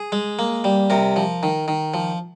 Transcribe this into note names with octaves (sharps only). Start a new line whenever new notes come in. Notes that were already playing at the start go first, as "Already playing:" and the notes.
Already playing: G#4
G#3
A#3
G3
C3 A#4
F3
D#3
D#3
F3